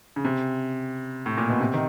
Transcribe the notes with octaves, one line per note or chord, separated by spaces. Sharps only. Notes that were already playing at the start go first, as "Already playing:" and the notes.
C#3
C3
A2
A#2
B2
C3
D#3